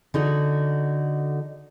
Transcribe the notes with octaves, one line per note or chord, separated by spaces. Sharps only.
D3 D#4 F#4